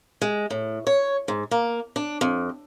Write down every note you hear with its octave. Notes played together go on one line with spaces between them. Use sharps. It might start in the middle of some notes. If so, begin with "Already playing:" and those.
G#3
A2
C#5
G#2
A#3
D4
F2